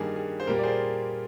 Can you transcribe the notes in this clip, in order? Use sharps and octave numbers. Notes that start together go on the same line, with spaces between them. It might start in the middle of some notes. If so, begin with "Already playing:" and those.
Already playing: G2 D#3 G3 A#3 G#4
G#4
C5
A#2 G3 A#3 G4 A#4
D5
G#4 C5